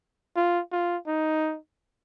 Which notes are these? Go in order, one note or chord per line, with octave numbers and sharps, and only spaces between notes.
F4
F4
D#4